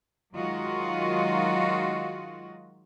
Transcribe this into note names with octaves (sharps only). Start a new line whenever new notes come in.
D#3 F#3 G#3 F4 F#4 D#5